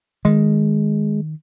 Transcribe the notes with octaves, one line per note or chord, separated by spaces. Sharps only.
D#3 G#3